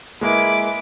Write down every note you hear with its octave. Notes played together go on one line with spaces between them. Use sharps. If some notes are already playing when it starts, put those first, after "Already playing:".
G#3 A#3 E4 B4 D6